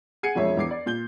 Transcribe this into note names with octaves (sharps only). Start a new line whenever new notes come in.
G#4 F#5 G#6 C7 C#7 D#7
E1 F2 G#3 C#5 E5
E2 D6 C7
D5
A#2 G6 G7